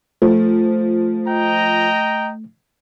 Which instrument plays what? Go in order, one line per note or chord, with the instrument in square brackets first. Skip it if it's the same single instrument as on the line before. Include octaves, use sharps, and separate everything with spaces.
[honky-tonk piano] F3 [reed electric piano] A3
[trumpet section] D#5 G5 A#5